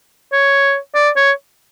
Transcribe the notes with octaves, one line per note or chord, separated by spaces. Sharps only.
C#5
D5
C#5